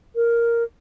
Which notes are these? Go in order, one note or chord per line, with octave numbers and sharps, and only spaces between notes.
A#4